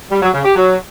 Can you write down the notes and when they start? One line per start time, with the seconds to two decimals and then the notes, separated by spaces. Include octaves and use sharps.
0.11 G3
0.22 F#3
0.33 C#3
0.45 G4
0.56 F#3